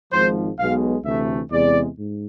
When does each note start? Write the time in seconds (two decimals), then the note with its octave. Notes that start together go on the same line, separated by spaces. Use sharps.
0.12 G#1 G#2 F3 C5
0.58 B1 B2 G#3 F5
1.04 D2 C3 E3 A3 E5
1.51 E2 C3 G#3 D5
1.98 G#2